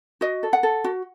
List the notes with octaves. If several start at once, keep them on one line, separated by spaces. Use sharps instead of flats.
F#4 D#5
A4
F#5
A4
F#4